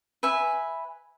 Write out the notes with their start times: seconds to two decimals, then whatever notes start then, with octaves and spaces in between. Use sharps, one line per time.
0.23 B4 E5 G#5